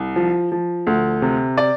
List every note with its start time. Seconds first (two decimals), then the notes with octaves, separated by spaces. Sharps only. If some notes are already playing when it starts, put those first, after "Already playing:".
Already playing: C2
0.16 F3
0.52 F3
0.87 D2
1.22 C3
1.58 D5